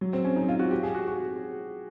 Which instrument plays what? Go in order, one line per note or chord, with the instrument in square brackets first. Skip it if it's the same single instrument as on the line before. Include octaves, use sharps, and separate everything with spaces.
[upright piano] F#3
C4
C#4
D#4
F4
F#4
G4
G#4
F#4
F#4